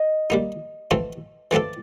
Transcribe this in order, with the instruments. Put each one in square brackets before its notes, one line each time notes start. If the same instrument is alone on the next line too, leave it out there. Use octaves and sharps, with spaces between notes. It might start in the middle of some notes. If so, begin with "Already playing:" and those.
Already playing: [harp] D#5
[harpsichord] G3 A#3 D#4
E3 A3 C4 F4 A4
[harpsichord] E3 A3 C4 F4 A4 [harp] D5